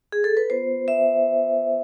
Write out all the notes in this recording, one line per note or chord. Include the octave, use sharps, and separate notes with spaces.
G#4
A4
B4
B3 F4 C5
E5